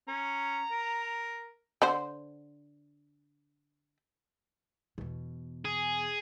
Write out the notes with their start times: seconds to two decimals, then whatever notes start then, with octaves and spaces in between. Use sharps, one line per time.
0.08 C#4 A#5
0.71 A#4
1.82 D3 C5
4.98 E2 B2
5.65 G#4